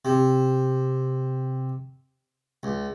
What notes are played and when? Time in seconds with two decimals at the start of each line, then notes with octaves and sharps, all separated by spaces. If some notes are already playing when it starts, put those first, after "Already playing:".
0.05 C3
2.63 C#2